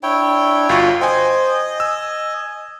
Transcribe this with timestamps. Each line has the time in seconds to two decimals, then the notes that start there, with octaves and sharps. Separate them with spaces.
0.03 D4 E4 C#5 G5
0.69 G1 F4 F#4 C#6
1.01 C5 D#5 G5 G#5
1.80 G#5 E6